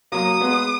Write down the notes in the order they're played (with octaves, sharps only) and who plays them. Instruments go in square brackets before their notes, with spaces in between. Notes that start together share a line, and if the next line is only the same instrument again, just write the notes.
[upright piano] F#3 A#3 [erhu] D#6
[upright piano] G#3 B3